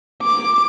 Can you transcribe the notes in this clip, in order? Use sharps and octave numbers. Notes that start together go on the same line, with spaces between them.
D6